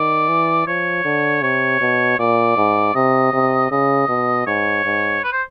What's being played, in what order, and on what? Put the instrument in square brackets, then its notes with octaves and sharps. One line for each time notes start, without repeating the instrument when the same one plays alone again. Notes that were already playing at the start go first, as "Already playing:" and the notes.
Already playing: [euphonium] D#3 [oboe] D5
[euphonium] E3
[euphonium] F3 [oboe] C#5
[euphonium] D3
[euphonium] C3 [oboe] C#5
[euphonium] B2
[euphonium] A#2 [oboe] D5
[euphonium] G#2
[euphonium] C3 [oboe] D#5
[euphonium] C3
[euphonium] C#3 [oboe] D#5
[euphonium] B2
[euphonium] G#2 [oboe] C#5
[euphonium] G#2
[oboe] B4
C5